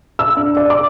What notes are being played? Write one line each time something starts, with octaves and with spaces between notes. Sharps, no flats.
E6
D4
D5
D6